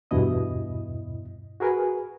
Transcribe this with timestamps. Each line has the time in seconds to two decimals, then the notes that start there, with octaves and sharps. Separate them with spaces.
0.11 E2 G2 B2 E4 D#5 D#6
1.60 F#4 G#4 A#4 B4 G#5